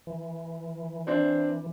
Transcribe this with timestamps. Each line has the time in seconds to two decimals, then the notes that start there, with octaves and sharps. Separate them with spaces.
0.07 E3
1.07 C4 D4